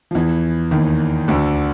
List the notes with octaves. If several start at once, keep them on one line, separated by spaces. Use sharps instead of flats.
F3
E2 E3
D#2 D#3
D2 D3